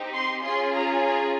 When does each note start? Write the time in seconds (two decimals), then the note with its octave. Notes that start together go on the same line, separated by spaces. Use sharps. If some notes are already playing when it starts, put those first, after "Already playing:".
Already playing: C4 D#4 G4
0.13 C6
0.43 C#4 F4 G#4 C6
0.73 A#5
1.03 A#5